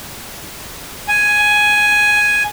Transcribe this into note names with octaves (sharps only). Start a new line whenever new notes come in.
G#5